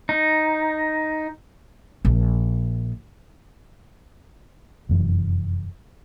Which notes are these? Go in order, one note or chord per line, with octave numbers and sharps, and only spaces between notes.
D#4
A#1
F1 F#2 E3 F#3